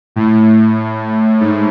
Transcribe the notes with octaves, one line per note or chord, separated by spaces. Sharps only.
A2
G#2